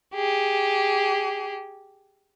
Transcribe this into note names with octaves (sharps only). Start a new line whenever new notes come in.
G4 G#4